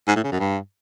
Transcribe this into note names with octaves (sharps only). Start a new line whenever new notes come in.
G#2
A2
C#3
F#2
G2